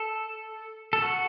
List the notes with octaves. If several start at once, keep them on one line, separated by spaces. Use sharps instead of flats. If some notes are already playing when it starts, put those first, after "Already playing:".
Already playing: A4
A4
F#4